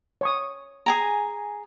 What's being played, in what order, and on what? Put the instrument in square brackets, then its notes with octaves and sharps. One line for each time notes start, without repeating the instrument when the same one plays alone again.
[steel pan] C#5 C#6 D#6
[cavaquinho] G#4 G#5 A#5